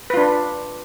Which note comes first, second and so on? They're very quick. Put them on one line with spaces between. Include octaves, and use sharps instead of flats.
B4 F4 D4